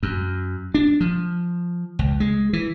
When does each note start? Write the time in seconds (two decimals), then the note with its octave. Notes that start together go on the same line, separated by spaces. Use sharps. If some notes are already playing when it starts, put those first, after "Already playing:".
0.03 F#2
0.74 D4
1.01 F3
1.99 C#2
2.20 G#3
2.53 E3